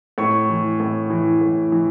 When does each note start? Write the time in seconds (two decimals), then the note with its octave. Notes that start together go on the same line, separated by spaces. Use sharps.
0.18 A2 C#6
0.49 E3
0.80 A2
1.10 E3
1.41 A2
1.72 E3